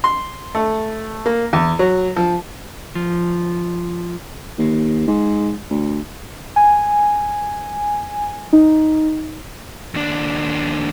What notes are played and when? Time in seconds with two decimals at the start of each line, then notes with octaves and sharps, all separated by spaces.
0.04 C6
0.55 A3
1.26 A#3
1.53 E2
1.79 F#3
2.16 F3
2.95 F3
4.59 D#2
5.08 G#2
5.70 D2
6.56 G#5
8.53 D#4
9.95 D#2 D4